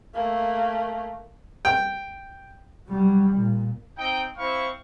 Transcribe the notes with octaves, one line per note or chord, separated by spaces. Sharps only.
A3 A#3
G5
F#3 G3
A#2
C4 D#4 G5
C4 E4 C5 F5 C#6